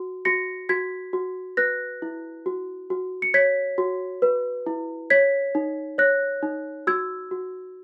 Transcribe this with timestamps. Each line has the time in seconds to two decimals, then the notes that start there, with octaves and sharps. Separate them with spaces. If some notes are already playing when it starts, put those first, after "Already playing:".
Already playing: F#4
0.25 F#4 A#6 C#7
0.69 F#4 G#6 B6
1.13 F#4
1.57 B4 F#6 A#6
2.02 E4
2.46 F#4
2.90 F#4
3.22 C#7
3.34 C#5 G#6 B6
3.78 F#4
4.22 B4
4.66 E4
5.10 C#5 G#6 B6
5.55 D#4
5.98 C#5 F#6 A#6
6.43 D#4
6.87 F#4 E6 G#6
7.31 F#4